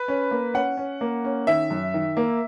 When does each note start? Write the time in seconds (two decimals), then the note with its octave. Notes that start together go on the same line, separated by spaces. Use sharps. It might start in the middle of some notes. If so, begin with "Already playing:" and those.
Already playing: B4
0.08 C#4
0.31 A#3
0.54 C#4 F#5
0.77 C#4
1.01 A#3
1.24 C#4
1.47 D#3 E5
1.70 F#2
1.94 D#3
2.17 A#3